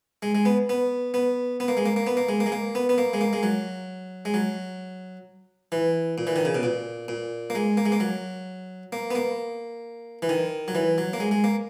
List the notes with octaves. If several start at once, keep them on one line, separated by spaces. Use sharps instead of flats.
G#3
G#3
B3
B3
B3
B3
A#3
G#3
A#3
A#3
B3
A#3
G#3
A#3
G#3
A#3
B3
B3
A#3
G#3
A#3
G#3
F#3
G#3
F#3
E3
A#2
E3
D#3
C#3
B2
A#2
A#2
A#3
G#3
A#3
G#3
A#3
F#3
A#3
B3
A#3
E3
D#3
F#3
E3
F#3
A#3
G#3
G#3
A#3